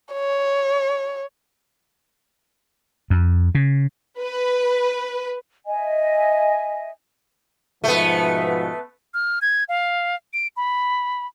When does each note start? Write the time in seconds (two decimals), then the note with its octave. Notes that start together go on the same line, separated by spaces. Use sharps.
0.13 C#5
3.10 F2
3.55 C#3
4.20 B4
5.66 D#5 E5 G#5
7.84 G#2 B2 F3 A3 B3
9.14 F6
9.41 G#6
9.69 F5
10.33 D7
10.57 B5